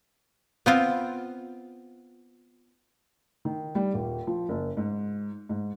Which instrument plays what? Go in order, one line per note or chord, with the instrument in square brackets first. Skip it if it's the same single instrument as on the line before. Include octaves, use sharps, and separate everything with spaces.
[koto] B3 C4 F4
[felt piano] D#3
G3
D#1
F3
F#1
G#2
G#2